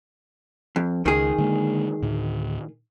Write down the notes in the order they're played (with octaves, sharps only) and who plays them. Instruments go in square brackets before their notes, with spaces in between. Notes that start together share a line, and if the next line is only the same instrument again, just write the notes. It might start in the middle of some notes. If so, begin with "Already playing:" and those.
[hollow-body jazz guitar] F2
[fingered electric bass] C#2 [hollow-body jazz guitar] D#3 G#4
[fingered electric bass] D3 G#3 A#3
D2 A2